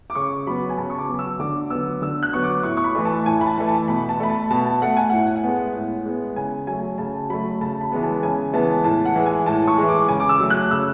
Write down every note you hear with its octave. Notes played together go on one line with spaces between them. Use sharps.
D6
C#3 C#6
F#3 B3 B5
G#5
C#3 A5
C#6
D6
F#3 B3
E6
D3 D6
F#3 B3 E6
D3 E6
F#6
F#3 B3 C#6
D6
A2 C#6
C#6
B5
E3 A3
A5
A2 G#5
B5
A5
E3 A3
A5
B2 B5
A5
A3 B5
A5
B2 A5
A5
A3 F#5
G#5
A2 F#5
F#5
G#3 B3
A2
G#3 B3
C#3 G#5
F#3 A3 G#5
C#3 A5
F#3 A3 B5
C#3 A5
B5
E3 G#3 B3
A5
C#3 G#5
E3 G#3 B3 A5
A2 A5
F#5
E3 G#3
G#5
A2 A5
C#6
E3 G#3
D6
C#3 G#5
D6
E6
F#3 A3
F#6
C#3 E6